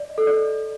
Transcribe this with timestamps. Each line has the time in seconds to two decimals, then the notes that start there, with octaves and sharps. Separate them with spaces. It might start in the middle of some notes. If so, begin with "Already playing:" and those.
Already playing: D5
0.10 D#5
0.18 A4
0.27 D5